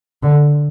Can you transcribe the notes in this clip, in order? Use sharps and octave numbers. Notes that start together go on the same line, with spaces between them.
D3